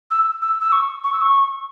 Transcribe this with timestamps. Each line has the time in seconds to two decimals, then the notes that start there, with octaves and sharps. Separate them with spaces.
0.11 E6
0.42 E6
0.61 E6
0.72 C#6
1.04 C#6
1.13 E6
1.21 C#6